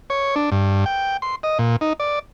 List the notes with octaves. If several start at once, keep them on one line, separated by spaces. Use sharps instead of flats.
C#5
D4
G2
G5
C6
D#5
A#2
D#4
D5